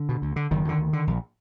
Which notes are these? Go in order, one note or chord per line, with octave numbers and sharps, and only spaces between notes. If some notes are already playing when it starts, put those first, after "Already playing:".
Already playing: D3
B2
D2
D3
F#1 D#3
F2 D3
D2
D3
A#1